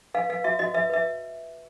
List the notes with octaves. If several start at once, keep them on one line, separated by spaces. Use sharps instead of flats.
B4 F5
B4 F5
F#4 E5
F#4 D#5
B4 E5
B4 E5